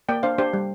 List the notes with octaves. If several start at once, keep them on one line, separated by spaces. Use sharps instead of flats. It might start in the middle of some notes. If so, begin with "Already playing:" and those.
A#3 D5 G5
D4 C5 F5
D4 G4 C5
G3